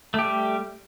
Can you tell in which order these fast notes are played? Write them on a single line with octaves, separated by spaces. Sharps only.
A3 G4 G3